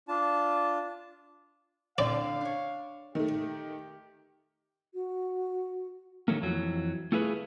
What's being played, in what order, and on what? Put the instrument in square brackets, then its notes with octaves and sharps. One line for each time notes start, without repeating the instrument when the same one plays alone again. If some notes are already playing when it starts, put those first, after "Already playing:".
[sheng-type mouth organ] D4 F4 A5
[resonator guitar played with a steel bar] A2 D3 C4 [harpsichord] D5 [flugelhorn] F5
[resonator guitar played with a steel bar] D4 C#5
[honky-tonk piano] D#3 A3 [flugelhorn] G4
[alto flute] F#4
[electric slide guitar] D#3 F#3 A3 A#3
F2 E3 F#3
A3 E4 F4 G#4 A#4 B4